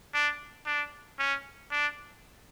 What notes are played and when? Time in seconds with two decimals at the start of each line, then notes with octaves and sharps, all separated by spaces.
0.14 D4
0.66 D4
1.19 C#4
1.71 D4